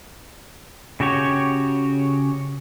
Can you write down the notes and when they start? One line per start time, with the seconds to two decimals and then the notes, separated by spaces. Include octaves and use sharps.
1.00 C#3 F#4 G4 C#5